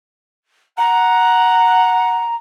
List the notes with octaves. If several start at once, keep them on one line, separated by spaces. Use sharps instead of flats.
F#5 A#5